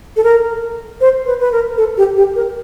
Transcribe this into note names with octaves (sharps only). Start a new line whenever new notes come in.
A4
A#4
C5
B4
B4
A#4
A4
G4
G4
A#4